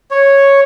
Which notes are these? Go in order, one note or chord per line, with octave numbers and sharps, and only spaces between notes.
C#5